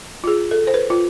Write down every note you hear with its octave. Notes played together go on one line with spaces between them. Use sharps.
F4
G#4
A4
C5
B4
F4